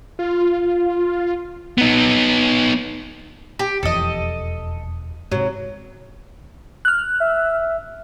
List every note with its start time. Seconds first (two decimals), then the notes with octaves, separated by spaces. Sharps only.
0.19 F4
1.78 B3 D#4
3.59 G4
3.83 E1 F2 E3 A4 D#5
5.32 G#2 C3 F#3
6.85 F6 F#6
7.20 E5